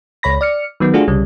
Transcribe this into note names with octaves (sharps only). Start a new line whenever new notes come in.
C#2 C#5 B5 A#6
D5 F6 C#7
D#3 F#3 B3
A3 D4 F4 F#4 G#4
C2 C#3 G3